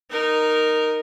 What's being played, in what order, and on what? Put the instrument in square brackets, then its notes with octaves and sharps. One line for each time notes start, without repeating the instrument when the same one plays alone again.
[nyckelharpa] D#4 A#4